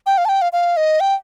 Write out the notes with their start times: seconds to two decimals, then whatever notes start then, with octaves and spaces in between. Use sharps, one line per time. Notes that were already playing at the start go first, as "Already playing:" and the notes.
0.06 G5
0.18 F5
0.25 A5
0.29 G5
0.42 F5
0.53 F5
0.77 D#5
1.00 G5